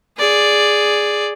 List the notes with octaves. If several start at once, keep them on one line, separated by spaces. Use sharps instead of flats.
G#4 D5